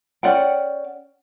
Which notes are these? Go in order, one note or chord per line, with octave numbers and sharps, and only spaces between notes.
C#4 D5 F#5 G5